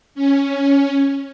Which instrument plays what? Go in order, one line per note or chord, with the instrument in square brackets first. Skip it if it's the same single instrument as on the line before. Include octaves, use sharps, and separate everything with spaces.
[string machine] C#4